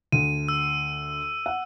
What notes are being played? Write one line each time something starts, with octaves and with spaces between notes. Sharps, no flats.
D2 D#7
E6
F#5